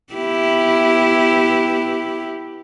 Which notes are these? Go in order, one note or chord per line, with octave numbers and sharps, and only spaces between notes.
B3 E4 G4